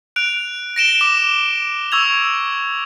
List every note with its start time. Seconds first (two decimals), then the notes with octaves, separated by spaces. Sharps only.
0.16 F#6 D7 F7
0.76 A#6 D7 E7 G7
1.01 D6
1.92 C#6 E6 G#6 F7